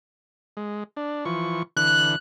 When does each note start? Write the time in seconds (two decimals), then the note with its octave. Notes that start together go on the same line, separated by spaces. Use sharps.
0.57 G#3
0.97 D4
1.25 E3 F3 C#6
1.77 D3 E3 F#6